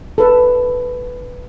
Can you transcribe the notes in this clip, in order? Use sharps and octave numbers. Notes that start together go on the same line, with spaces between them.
A4 B4